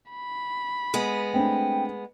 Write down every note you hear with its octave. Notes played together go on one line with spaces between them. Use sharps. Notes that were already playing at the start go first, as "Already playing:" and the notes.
B5
G#3 B3
A3 C4 D4 G5